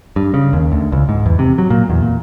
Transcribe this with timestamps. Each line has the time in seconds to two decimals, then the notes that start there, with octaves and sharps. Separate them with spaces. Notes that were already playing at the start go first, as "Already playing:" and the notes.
0.16 G2
0.34 C#3
0.53 D#2
0.72 D2
0.92 C#2
1.09 G#2
1.26 E2
1.39 C3
1.58 F#3
1.70 A#2
1.90 E2
2.03 A#2